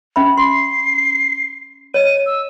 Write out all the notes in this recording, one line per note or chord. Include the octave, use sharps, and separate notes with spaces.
C#4 E5 B5
C6 C7
C#5 D#5 D#7
E6